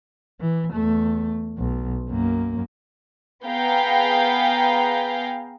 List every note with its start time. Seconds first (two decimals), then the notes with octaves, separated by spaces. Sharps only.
0.41 E3
0.73 E2 A3
1.58 B1
2.09 F#2 A#3
3.45 B3 G#4 F5 G5 A#5